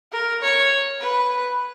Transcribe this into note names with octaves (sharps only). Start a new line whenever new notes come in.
A#4
C#5
B4